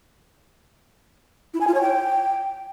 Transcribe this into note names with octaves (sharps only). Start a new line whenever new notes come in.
E4
G#5
F4
C#5
G5